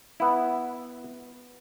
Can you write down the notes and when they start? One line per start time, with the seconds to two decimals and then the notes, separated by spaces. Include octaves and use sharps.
0.20 B3 E4